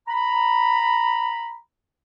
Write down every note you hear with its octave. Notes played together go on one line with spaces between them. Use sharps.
A#5 B5